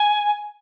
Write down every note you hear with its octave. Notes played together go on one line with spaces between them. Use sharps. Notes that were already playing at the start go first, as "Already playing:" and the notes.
Already playing: G#5